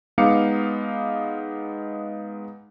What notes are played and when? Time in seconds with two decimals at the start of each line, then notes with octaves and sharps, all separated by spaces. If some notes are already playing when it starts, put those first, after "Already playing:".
0.18 G#3 B3 D#4 F5 D6 C#7